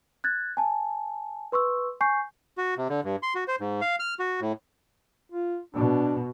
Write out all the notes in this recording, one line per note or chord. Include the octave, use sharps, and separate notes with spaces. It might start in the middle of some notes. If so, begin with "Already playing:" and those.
F#6 G#6 A6
G#5 A5
B4 C6 C#6 E6
G#5 C#6 G6 C7
F#4
C3
D3
G2
C6
F#4
C5
G#2
F5
F6
F#4
A2
F4
B2 D4